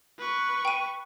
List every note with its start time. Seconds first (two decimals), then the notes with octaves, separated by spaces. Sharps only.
0.18 B4 C#6
0.65 G5 D#7